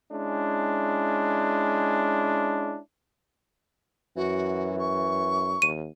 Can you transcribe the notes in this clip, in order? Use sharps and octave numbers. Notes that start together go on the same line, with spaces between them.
G#3 C#4 D4 E4
F#2 E3 F#4
C#6
D#2 D#7